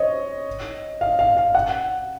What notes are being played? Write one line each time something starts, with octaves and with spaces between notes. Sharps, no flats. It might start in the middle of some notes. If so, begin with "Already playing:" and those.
Already playing: C5 C#5 D#5
F5
F5
F5
F#5